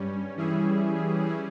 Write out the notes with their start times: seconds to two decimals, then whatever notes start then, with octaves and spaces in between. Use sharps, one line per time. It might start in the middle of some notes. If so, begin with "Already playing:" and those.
Already playing: G2 G3 C#4
0.37 E3 G3 C#4 E4 G#4